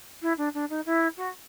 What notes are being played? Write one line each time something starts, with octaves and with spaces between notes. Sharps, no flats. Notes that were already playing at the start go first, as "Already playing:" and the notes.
E4
D4
D4
D#4
E4
F#4